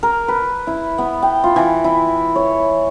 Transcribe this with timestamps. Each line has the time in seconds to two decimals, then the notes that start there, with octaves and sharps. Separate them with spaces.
0.03 A#4
0.28 B4
0.67 E4
0.98 B3
1.22 G5
1.44 F4
1.56 E3
1.84 E4
2.36 C#5